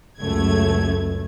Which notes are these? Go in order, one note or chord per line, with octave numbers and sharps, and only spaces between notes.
C#2 F#2 A3 G#6